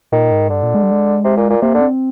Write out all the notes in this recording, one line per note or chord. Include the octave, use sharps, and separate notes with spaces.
A#2 D#3
G#2
G2 D3
A#2
G#3
G3
G#3
C3
A#2
A#2
C3 A#3
D3
C4